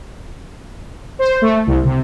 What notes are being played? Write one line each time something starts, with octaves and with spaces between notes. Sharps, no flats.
C5
A3
C2
C3